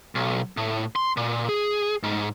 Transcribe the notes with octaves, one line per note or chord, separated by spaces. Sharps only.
B1
A2
C6
A#2
G#4
G#2